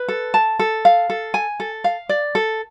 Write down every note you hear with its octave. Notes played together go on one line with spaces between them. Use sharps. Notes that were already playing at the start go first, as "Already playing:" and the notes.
Already playing: B4
A4
A5
A4
F5
A4
G#5
A4
F5
D5
A4